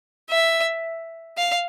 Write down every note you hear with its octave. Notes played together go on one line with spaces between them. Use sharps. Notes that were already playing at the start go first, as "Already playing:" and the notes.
E5
F5